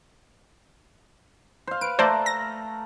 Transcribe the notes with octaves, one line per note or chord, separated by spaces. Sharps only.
C5 F5
B4 D7
A3 A4 C5 D5 A#5
A#6